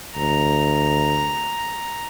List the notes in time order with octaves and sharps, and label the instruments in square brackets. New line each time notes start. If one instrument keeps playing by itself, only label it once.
[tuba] D2 [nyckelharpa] A#5